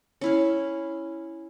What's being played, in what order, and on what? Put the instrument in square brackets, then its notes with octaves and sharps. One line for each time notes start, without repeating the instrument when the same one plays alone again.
[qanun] C#4 E4 F5